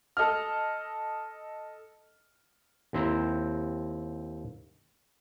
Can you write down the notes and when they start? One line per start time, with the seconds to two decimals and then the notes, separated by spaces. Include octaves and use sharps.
0.17 A4 D#5 F6
2.93 D#2 C4 E4 C5 A#5